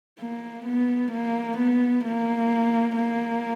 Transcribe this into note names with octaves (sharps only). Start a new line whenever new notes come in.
A#3
B3
A#3
B3
A#3
A#3